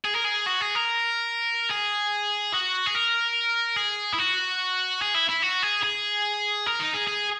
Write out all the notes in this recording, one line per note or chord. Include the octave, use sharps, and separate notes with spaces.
G#4
A#4
G#4
F#4
G#4
A#4
G#4
F#4
G#4
A#4
G#4
E4
F#4
G#4
E4
E4
F#4
G#4
G#4
A#4
D#4
G#4
G#4